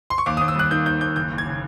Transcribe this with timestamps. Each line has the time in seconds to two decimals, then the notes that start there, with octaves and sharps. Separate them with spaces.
0.10 C6
0.18 C#6
0.26 D#2 D6
0.37 D#6
0.41 D#2
0.48 E6
0.56 G3 F#6
0.71 D#3 G6
0.86 D#2 G6
1.01 D#2 G6
1.16 F#1 G6
1.31 F#1
1.38 G#6
1.46 C#3